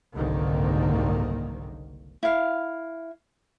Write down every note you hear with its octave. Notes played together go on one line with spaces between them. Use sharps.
F#1 C2 G#2 D3 D#3 A#3
E4 F5